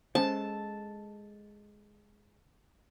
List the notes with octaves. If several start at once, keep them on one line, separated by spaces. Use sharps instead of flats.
G#3 C#4 A4 C5 A5